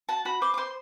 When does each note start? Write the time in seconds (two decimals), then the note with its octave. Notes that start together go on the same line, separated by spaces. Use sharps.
0.09 F#4 A5
0.25 F#4 B5
0.41 C5 D6
0.54 D6
0.58 C5 C6